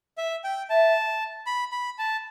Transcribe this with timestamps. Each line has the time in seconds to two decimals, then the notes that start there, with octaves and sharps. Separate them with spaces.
0.18 E5
0.44 G5
0.70 E5 A5
1.46 B5
1.72 B5
1.99 A5